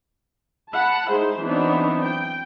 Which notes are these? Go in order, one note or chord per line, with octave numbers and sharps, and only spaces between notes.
F#5 A5 B5
G#3 D#4 E4 G#4 C5
E3 F#3 B3 C4 D4 D#4
G5